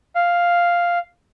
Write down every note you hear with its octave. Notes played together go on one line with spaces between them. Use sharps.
F5